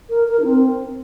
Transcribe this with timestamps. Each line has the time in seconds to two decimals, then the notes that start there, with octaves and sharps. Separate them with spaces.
0.10 A#4
0.28 A#4
0.40 D#4
0.44 C4